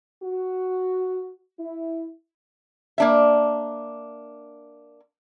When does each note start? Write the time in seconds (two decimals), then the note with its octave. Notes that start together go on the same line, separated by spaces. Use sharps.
0.23 F#4
1.60 E4
2.98 A#3 D4 E5